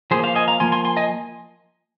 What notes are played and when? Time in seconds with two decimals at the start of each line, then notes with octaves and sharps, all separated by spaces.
0.11 F3 A#3 G#4 C5
0.24 C5 F5
0.35 D#5 G#5
0.48 F5 A#5
0.60 F3 A#3 G#5 C6
0.72 G#5 C6
0.85 G#5 C6
0.97 D#5 G#5